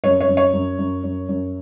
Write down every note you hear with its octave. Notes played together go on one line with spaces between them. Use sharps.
F#2 C#5
C#5
F#2
C#5
F#2
F#2
F#2
F#2